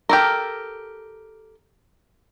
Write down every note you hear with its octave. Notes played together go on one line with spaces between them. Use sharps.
G4 A4 A#4